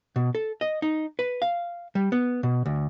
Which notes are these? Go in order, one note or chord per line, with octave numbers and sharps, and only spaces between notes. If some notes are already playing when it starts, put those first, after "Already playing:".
B2
A4
D#5
D#4
B4
F5
G3
B3
B2
D2